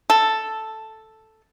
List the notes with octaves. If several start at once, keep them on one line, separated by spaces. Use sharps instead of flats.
A4